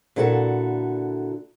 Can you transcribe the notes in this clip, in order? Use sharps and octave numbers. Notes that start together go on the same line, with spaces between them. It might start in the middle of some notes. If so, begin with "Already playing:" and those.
A#2 D3 E4 F#4 A4